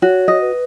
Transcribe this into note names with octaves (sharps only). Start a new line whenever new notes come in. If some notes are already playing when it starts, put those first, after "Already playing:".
F#4 C#5
D#5
B4